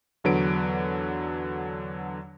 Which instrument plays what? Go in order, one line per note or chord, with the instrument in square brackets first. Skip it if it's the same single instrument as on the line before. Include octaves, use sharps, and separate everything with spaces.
[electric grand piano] E2 D3 F#3 B4 D7